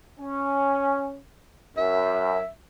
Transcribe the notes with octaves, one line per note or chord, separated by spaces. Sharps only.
C#4
F#2 E5